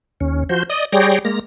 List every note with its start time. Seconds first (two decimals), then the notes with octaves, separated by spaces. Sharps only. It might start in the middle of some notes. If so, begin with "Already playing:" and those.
0.21 D#2 C#4
0.49 F3 F#4 C5 G6
0.70 D5 D#5 D#6
0.93 G3 G#4 C#5 D5 G5 A#6
1.25 G#3 A#3 A#5 A#6